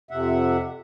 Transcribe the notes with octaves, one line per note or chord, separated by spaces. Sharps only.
F2 C3 E5 F#5